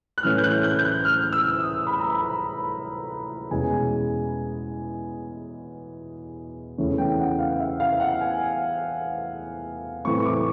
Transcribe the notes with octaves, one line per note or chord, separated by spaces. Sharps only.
F#6
A2 E3 A3 C#4 F6
G6
F#6
G6
G6
F#6
F6
E6
D#6
B5
A#5
B5
E2 B2 G#3 C#4 G#5
E2 C#3 E3 A3 C#4
G5
F#5
F5
E5
F5
F#5
G#5
A2 E3 A3 C4 C#6
C#6
D6